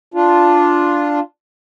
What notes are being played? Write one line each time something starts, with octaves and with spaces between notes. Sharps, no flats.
D4 F4